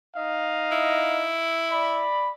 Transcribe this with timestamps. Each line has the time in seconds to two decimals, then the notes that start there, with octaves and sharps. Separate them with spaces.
0.16 D#4 D#5 F5
0.72 E4
1.71 D5 B5